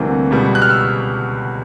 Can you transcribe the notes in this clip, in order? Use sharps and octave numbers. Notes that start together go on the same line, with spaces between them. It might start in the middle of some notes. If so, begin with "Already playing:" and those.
Already playing: D2 C3 E3 G3 A#3
C#2 B2 G3 B3
F#6
F6
E6